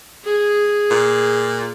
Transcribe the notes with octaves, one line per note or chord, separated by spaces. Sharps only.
G#4
A#2